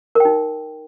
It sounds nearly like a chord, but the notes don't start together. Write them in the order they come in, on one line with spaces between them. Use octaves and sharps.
A#4 G5 D#4